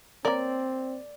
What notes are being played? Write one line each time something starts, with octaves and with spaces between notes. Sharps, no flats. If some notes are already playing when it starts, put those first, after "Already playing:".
A#3 C4 A#4 D5